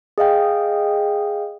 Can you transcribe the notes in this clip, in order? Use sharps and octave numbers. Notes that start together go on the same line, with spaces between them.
G#4 D#5 F5 G5